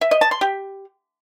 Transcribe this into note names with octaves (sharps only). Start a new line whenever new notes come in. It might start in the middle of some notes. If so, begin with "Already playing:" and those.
E5
D#5
A5
C6
G4